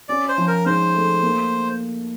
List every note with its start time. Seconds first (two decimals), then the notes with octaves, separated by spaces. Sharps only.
0.09 C#4 D5
0.29 C5
0.38 F3
0.48 A#4
0.66 G#2 C5
0.95 A3
1.23 A#3